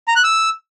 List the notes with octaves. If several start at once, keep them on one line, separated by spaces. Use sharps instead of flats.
A#5
F#6
E6